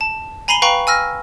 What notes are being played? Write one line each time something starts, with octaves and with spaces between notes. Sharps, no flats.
A5
G#5 A#5 B5 C7 D#7 G7
B4 F5 G5 A#5 B5 C#6
G#5 E6 F6 A#6